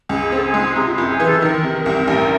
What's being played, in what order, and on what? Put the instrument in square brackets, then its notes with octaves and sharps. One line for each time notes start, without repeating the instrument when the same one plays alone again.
[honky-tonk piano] C#2 [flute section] G#4
[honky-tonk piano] C4 [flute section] A4
[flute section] G#4
[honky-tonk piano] G#3
[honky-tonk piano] C3 [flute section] D#4
[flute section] F4
E4
[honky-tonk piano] F#1
[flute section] G#4
[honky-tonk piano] E3
[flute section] A4
[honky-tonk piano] D#3 [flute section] A#4
[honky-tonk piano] C3
C2
A1